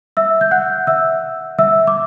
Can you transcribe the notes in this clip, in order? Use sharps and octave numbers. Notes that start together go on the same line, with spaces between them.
E5 E6
G6
F#5 F#6
E5 E6
E5 E6
D6